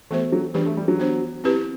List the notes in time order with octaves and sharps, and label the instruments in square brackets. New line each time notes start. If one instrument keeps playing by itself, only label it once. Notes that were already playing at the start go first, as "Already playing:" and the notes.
[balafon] E3 B3 F#4 A4 C5 [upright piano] A3
[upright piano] F#3
[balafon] E3 B3 D4 G4 B4 [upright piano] G3
[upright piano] A3
G3
F#3
[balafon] B3 D4 F#4 C5
C4 E4 G4 B4